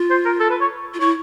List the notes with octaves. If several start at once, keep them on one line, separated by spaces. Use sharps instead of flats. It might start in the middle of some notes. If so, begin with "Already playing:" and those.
Already playing: F4
C5
A#4
A4
B4
C#5
F4
E4 C#5